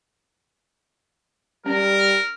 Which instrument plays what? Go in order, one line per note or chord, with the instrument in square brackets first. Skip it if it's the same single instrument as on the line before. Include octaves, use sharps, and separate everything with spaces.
[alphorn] G3 [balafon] C#4 [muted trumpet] A#4